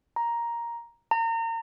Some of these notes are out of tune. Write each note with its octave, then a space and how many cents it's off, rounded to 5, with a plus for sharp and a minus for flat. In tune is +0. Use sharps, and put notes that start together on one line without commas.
A#5 +5
A#5 -35